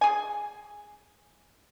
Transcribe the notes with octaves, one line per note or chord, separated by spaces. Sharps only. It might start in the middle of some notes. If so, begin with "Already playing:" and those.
G#4 G#5